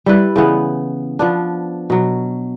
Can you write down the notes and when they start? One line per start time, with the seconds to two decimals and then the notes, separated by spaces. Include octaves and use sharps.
0.06 G3 E4 B4
0.36 C#3 E3 B3
1.19 F3 B3 D4
1.90 B2 F#3